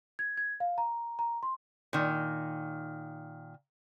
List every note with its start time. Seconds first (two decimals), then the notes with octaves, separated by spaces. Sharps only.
0.19 G#6
0.37 G#6
0.60 F5
0.78 A#5
1.19 A#5
1.43 C6
1.93 A#2 D#3